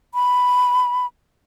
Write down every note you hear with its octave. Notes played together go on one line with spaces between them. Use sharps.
B5